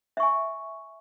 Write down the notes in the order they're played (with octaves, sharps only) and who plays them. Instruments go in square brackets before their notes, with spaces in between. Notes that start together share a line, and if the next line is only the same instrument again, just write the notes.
[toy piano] E5
C#6
G#5